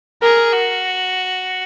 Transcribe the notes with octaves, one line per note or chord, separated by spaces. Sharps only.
G#4 A#4
F#4